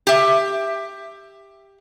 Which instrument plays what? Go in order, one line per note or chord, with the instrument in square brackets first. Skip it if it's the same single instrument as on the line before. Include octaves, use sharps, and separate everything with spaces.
[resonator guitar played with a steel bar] G4 E5